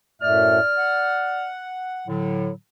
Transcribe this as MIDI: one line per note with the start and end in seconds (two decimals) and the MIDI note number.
0.22 0.59 42
0.22 0.59 45
0.22 0.59 57
0.22 1.46 74
0.22 1.46 89
0.78 2.07 78
2.08 2.50 45
2.08 2.50 50
2.08 2.50 54